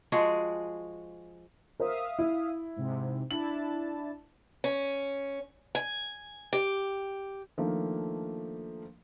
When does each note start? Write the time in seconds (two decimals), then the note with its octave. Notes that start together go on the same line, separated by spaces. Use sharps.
0.12 F3 G#3 F#4 G#4
1.80 A#4 C5 E5 F5 D#6
2.19 E4
2.76 G#2 C3
3.31 D4 E4 A5 F#7
4.64 C#4
5.75 G#5
6.53 G4
7.58 D#3 F3 A3 A#3 D4